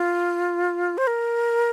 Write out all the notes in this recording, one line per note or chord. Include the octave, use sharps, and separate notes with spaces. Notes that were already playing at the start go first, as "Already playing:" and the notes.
Already playing: F4
C5
A#4